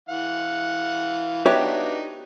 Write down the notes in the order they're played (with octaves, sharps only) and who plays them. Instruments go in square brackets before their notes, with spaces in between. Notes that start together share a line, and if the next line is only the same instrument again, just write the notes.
[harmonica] E3 F5 F#5
[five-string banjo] B3 C#5 E5 [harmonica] D4 D#4 [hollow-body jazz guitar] F#4 G4 B4